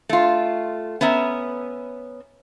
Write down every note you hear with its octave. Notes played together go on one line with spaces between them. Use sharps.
A3 F4
B3 C#4 E5 A#5